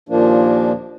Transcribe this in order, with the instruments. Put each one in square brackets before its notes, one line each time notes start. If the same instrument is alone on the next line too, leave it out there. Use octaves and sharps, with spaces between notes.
[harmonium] D#2 A#2 F3 A#3 D4